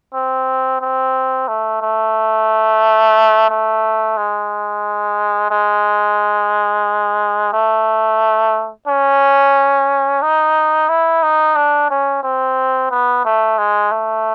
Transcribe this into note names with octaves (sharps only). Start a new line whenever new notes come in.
C4
C4
A3
A3
A3
G#3
G#3
A3
C#4
D#4
E4
D#4
D4
C#4
C4
B3
A3
G#3
A3